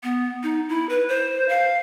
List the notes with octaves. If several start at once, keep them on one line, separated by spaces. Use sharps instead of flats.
B3
D#4
E4
B4
C5
F5